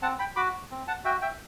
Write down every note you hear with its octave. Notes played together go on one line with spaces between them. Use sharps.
C4 F#5 A5
G5 B5
F#4 B5 D6
C4
F#5 A5
F#4 E5 G5
E5 G5